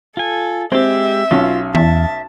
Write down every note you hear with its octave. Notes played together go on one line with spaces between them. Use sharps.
F4 A4 G#5
G#3 C4 G4 E5
B1 C#4 F4
E2 E5 A5